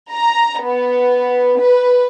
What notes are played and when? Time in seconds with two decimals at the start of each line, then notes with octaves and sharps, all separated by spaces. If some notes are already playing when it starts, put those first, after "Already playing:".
0.10 A#5
0.63 B3
1.60 B4